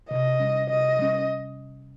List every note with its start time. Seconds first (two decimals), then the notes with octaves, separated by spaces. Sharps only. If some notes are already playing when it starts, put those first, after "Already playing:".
0.10 C3 D#5
0.40 G3 C#4
0.70 C3 D#5
0.99 G3 C#4